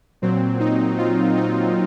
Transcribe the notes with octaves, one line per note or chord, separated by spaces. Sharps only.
A#2 F#3 C4
D#4
F4
D#4